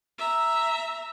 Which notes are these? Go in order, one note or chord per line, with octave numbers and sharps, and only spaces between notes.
E5 A#5